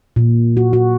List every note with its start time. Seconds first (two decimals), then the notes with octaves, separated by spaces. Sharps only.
0.16 A#2
0.57 F#4
0.73 F#4